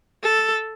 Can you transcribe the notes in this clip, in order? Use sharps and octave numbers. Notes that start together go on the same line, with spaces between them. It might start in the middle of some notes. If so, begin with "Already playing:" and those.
A4